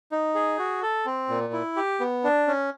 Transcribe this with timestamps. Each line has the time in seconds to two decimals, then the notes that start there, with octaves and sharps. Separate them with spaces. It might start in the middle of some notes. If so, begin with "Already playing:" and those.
0.12 D#4
0.35 G#4
0.59 F#4
0.82 A4
1.06 C4
1.29 A#2
1.53 E4
1.76 G4
2.00 B3
2.24 D4
2.47 C#4